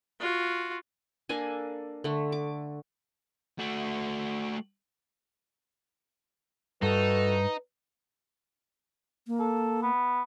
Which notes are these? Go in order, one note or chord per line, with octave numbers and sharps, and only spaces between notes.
F4 F#4
A#3 D4 A4 G#5
D3 A3
D6
A3 F#4
G2 A3 D#4 F#4 A4 B4
A#3
A4
B3